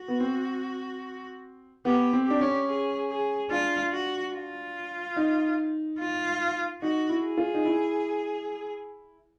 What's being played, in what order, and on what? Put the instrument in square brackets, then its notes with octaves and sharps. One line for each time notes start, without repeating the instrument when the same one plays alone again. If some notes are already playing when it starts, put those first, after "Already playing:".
Already playing: [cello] F#4
[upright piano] B3
C4
[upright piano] B3 [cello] G4
[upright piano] C4
[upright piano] D4 [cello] G4
[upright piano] C#4
[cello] G#4
G#4
[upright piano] D4 [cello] F4
[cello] F#4
F4
[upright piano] D#4
[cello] F4
[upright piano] D#4 [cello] F#4
[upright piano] E4
[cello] G#4
[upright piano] F4
D#4
E4